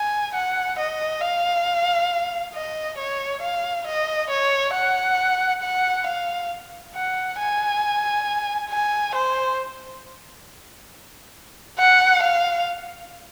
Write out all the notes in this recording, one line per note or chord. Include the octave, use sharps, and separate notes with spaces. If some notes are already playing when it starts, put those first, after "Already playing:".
Already playing: G#5
F#5
D#5
F5
D#5
C#5
F5
D#5
C#5
F#5
F#5
F5
F#5
G#5
G#5
C5
F#5
F5